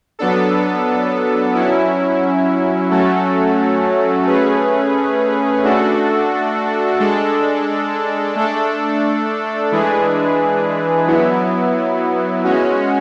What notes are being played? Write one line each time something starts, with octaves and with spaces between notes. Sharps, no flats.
F#3 B3 D4 A4
F#3 C#4 E4
F#3 A3 C#4 F#4 A4
A3 C#4 G#4 B4
A3 D4 F#4 A4
G#3 D4 A4
A3 D4 A4
E3 G#3 D4 G#4 B4
F#3 B3 E4
G#3 C#4 F#4